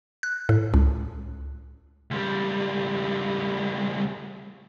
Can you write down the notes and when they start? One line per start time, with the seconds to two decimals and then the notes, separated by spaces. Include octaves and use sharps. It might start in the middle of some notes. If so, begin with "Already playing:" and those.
0.23 F#6
0.49 A2
0.74 C#2
2.11 C#2 G3